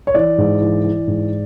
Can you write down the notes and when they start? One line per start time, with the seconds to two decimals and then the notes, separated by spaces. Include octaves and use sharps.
0.07 C#5
0.15 E3 D5
0.38 G#2
0.62 E3
0.85 E3
1.08 G#2